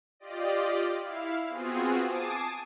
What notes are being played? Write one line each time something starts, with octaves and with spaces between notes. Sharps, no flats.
F4 G4 D5 D#5
E4 F5
B3 C4 F4 F#4 G#4
G#5 A5 D6 D#6 C7 D#7